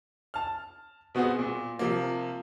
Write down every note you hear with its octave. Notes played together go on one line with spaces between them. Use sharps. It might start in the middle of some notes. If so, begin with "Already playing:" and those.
A5 F6
B2 B3 C4 F#4 G#4
A#2
C3 F3 A#3